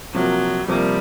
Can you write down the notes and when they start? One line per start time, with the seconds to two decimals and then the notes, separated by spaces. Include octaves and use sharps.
0.14 C3 F3 F#3 A#3
0.68 C3 F3 G3 A#3